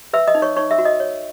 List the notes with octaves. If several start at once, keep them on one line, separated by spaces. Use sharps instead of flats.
B4 E5 E6
D#5 D#6
D#4
C#5 C#6
D#4 C#5 C#6
E5 E6
F#4
D#5 D#6
C#5